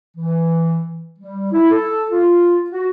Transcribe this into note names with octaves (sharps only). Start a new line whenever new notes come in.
E3
G3
E4
A4
F4
F#4